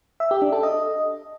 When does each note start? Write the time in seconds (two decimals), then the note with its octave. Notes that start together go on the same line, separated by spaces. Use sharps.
0.20 E5
0.31 G4
0.42 D4
0.52 A4
0.63 D#5